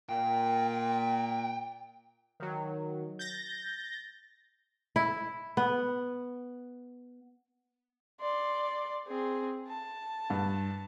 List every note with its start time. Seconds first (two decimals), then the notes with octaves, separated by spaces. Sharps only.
0.09 A#2 G5
2.40 D#3 F#3
3.19 G6 A6 A#6
4.96 E4
5.57 B3
8.21 D5 C6
9.07 C4 G#4
9.68 A5
10.30 G2